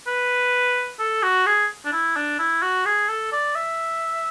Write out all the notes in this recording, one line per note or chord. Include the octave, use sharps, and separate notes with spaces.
B4
A4
F#4
G#4
D4
E4
D4
E4
F#4
G#4
A4
D5
E5